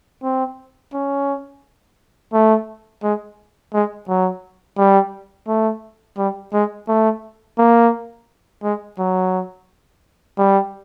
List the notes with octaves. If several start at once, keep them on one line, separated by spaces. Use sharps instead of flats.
C4
C#4
A3
G#3
G#3
F#3
G3
A3
G3
G#3
A3
A#3
G#3
F#3
G3